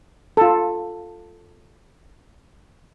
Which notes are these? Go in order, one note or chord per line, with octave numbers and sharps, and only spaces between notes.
F4 A4